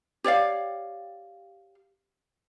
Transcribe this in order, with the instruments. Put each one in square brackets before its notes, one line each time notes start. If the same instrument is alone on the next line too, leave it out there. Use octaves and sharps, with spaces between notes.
[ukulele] G4 C#5 D5 F5